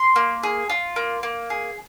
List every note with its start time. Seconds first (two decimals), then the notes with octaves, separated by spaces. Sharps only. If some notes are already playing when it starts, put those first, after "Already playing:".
Already playing: C6
0.16 A#3
0.43 G#4
0.70 F4
0.96 A#3
1.23 A#3
1.50 G#4